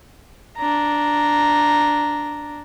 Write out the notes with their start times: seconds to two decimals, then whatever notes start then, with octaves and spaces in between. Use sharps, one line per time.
0.57 D4 A#5